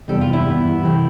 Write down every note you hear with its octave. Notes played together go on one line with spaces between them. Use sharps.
E2 C3 G3 D4 A4
F4
E4
G2 E3 B3
C3 E3 A3 C4